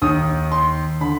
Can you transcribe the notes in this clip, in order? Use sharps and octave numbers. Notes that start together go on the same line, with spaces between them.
D#2 D#3 D#6
C6
D3 B5